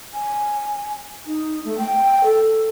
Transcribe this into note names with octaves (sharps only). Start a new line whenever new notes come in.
G#5
D#4
A3
G5
A4